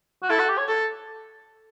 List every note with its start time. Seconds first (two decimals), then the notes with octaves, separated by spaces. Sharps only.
0.23 F#4
0.30 E4 A4
0.39 F#4
0.49 G4
0.58 C#5
0.68 A4